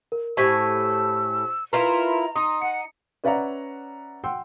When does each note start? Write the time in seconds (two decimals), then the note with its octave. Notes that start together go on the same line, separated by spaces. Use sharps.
0.12 A#4
0.37 A2 G4 C5 G#5 C#6 E6 B6
1.73 E4 F4 A#4 B4 A#5 C6
2.36 D#4 C6 D#6
2.62 F#5 C#7
3.24 C#4 B4 D5 E5 F#5 A#5
4.24 F#5 G5 C6 E6